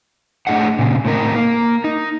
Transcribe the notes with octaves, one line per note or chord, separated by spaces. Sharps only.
A3 D4 G#4 D#5 F#5
A#2 C#3
A2 C4 D#4 A#4
A#3
D#4